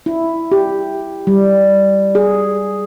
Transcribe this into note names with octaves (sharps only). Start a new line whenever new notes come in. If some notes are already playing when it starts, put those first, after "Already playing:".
E4
G4
G3
G#4